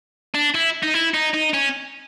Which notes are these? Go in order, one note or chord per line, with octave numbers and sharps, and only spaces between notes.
D4
E4
D#4
E4
D#4
D#4
C#4